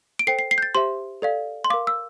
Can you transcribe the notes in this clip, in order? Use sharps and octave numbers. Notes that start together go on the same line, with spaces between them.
D7
A4 C5 G5 C7
C7
C7
G6
A6
G4 C5 E5 C6
A4 D5 F5
C6
A#4 F5 D6
E6